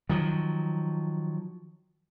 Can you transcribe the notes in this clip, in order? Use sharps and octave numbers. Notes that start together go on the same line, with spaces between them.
D#3 F3 F#3